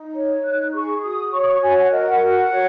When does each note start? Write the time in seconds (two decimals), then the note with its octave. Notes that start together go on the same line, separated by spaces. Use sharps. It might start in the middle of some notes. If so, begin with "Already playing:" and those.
Already playing: D#4
0.15 C#5
0.44 D#4 F#6
0.74 G#4 C#6
1.03 F#4 D#6
1.33 C#5 C#6
1.40 D#6
1.47 C#6
1.61 F#4 G#5
1.77 F#5
1.91 A#4 D#5
2.06 F#5
2.21 F#4
2.50 C#5